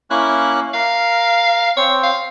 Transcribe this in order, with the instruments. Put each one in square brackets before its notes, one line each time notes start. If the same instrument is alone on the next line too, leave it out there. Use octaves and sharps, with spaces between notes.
[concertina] A#3 C#4 F#6 [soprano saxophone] E4
[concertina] A#4 [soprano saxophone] F5
[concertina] C4 [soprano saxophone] C#5
[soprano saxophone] F5